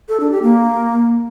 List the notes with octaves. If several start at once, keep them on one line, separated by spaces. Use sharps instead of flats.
A4
D4
G4
A#3